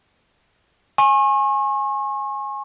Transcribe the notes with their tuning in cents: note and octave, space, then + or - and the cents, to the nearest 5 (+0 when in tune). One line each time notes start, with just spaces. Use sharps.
G#5 +0 C#6 -40